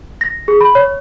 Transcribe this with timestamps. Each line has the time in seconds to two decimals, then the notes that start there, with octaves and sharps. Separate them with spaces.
0.21 A#6
0.48 G#4
0.61 B5
0.75 C#5